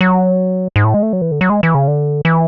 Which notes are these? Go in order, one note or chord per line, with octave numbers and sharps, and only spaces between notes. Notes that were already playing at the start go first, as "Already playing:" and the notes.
F#3
G#2
A2
G#3
A3
F#3
E3
D3
F#3
G#3
E3
C#3
D3
E3